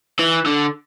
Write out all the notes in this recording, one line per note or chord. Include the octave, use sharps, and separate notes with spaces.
E3
D3